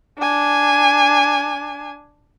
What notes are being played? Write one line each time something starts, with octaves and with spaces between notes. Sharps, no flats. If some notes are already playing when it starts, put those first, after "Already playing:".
D4 G#5